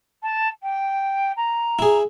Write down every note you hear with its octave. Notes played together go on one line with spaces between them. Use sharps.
A5
G5
A#5
E4 G#4